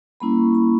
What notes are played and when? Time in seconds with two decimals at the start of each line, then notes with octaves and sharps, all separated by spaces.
0.20 G3 A#3 C#4 E4 B5
0.38 C#6
0.55 B5